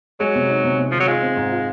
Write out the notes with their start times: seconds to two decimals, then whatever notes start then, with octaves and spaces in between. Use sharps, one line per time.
0.20 F#3 G#3
0.35 C3
0.49 D#4
0.64 C3
0.79 C3
0.92 D#3 F3
1.00 F#3
1.07 G#3 F4
1.22 C4
1.36 G#2
1.52 F4